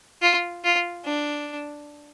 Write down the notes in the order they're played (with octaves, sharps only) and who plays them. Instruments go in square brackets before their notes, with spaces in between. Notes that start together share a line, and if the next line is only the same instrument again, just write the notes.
[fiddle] F4
F4
D4